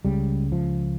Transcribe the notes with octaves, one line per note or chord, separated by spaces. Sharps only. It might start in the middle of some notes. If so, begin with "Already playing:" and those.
C#2 C#3 G3
F3